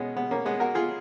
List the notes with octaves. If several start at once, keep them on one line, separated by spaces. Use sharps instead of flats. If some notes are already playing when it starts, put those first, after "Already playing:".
Already playing: B2 G#3 B3 C#4
G#3 B3
A#3 C#4
G#3 B3
F#4 A#4
F4 G#4